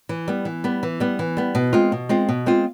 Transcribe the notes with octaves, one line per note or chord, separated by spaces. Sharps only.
E3
G3 B3
E3
G3 B3
E3
G3 B3
E3
G3 B3
B2
G#3 C4 F4
B2
G#3 C4 F4
B2
G#3 C4 F4